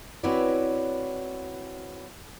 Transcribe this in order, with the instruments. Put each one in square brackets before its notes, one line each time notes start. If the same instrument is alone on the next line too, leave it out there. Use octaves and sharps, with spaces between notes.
[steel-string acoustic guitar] C4 E4 F#4 B4 C#5 D5